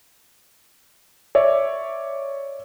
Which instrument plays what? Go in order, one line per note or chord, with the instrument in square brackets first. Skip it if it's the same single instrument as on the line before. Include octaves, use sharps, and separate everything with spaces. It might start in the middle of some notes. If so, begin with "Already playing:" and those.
[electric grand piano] C#5 D5 E5